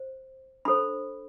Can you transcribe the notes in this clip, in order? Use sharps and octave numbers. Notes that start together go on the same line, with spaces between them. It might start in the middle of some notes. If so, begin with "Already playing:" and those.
Already playing: C5
D4 A4 C5 B5